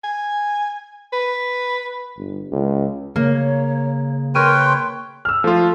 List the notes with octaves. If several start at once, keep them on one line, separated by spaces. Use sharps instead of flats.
G#5
B4
G1
C#2
C#3 A#3 C#5
A#4 B4 C#5 G5 C6 F6 D#7
E6 F6
F3 A3 F4